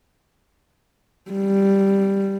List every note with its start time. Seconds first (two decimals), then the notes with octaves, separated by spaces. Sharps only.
1.31 G3